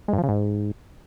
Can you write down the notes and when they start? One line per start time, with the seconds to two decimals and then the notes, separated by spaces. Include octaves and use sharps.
0.08 G#3
0.13 G2
0.18 F3
0.23 C#3
0.29 G#2